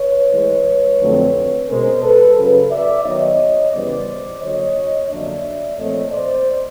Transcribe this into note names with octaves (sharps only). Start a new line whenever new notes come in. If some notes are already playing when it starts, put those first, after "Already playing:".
Already playing: B4 C#5
A2 E3 G#3
F2 D3 F#3 A3 C4
B2 G#3 C#4 A#4 C5
A4 B4
F#2 C#3 F#3 A4 B4
D5 E5
D#3 F#3 B3 D#4 C#5 D#5
E2 C#3 E3 G3 B3 C5 D5
D3 F#3 A#3 C#5 D#5
F2 D3 F#3 A#3 D4 D5 E5
A#2 F3 A3 C4 C#5 D#5
C5 D5